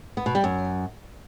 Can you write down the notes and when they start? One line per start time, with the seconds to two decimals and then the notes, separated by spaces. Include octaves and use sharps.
0.17 B3
0.26 B2
0.35 G3
0.44 F#2